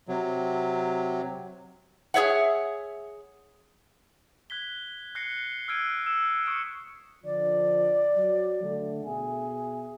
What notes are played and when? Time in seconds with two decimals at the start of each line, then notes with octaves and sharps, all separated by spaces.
0.08 C3 F#3
2.14 G#4 A4 C#5 E5 F#5
4.50 F#6 G#6 B6 G7
5.15 F#6 A#6 C7 C#7
5.68 E6 F6 G#6 D7 D#7
6.06 E6 E7
6.46 C#6 D#6 C#7 D7
7.24 D3 F3 D5
8.16 F#3
8.63 D3 A3
9.05 B2 G#4 E5 G#5